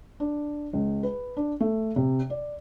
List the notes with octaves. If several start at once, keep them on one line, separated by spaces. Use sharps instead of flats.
D4
C#2
B4
D4
A3
C3
D5